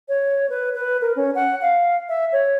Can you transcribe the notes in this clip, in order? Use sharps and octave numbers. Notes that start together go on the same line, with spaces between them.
C#5
B4
B4
A#4
C#4
F#5
F5
E5
C#5